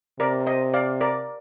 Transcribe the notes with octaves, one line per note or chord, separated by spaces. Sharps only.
C3 A#4 D5
C5 D#5
D5 F5
A#4 D5